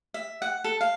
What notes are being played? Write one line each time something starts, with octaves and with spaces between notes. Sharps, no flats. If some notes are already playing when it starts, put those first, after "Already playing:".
E5
F#5
A4
F5